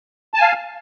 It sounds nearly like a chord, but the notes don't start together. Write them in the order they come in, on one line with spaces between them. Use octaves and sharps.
A5 G#5 F5